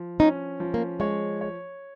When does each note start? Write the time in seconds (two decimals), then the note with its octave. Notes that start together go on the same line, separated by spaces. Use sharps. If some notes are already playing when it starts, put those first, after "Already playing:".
Already playing: F3
0.20 C#4 D#4
0.60 F3
0.74 A#3
1.00 G#3 C#5
1.41 C#5